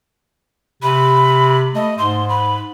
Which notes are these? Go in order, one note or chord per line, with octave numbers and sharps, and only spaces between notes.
C3 B5
A3 D#5
G#2 C6
B5